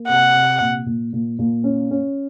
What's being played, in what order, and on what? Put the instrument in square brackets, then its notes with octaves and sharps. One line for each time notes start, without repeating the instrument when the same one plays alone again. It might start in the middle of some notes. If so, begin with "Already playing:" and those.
Already playing: [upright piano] A#3
[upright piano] C3 [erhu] F#5
[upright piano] C3
A#2
A#2
A#2
A#2
C#4
C#4